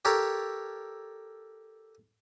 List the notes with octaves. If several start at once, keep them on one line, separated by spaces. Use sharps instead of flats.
G4 A4 A#4 C#5